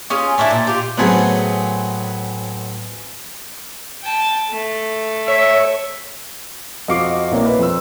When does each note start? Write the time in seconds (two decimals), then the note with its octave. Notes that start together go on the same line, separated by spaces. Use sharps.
0.10 C#4 F4 G#4
0.38 A3 C#4 D4 E4
0.51 A#2
0.67 F4 G4
0.98 A2 F#3 B3 C4 G#4
4.02 G5 A5
4.50 A3
5.28 C#5 E5
6.88 F2 F#4 D#5 F5 D6 C7
7.32 C2 A#3 C#5
7.45 B4
7.59 F2 E6